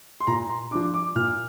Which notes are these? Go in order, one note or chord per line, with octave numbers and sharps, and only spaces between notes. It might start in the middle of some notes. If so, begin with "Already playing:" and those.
C6
A#2 A#5
C6
F3 D4 D6
D6
A#2 F6